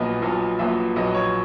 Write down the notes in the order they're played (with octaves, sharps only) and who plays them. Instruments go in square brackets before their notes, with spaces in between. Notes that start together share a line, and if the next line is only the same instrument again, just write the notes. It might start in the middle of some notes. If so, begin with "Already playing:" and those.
Already playing: [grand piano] A#1 A#2 F#3 B3 D#5
A#1 A#2 F#3 B3
A#1 A#2 F#3 B3 E5
A#1 A#2 F#3 B3 D#5
C#5